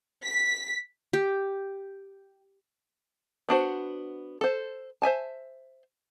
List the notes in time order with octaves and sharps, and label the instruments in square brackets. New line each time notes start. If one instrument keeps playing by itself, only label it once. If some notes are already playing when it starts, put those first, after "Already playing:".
[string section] B6
[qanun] G4
[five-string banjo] B3 D4 F#4 C5
A4 C5
C5 E5 G#5 A5